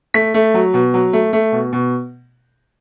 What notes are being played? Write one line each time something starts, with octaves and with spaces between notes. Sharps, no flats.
A3 B6
A3
F#3
B2
F#3
A3
A3
B2
B2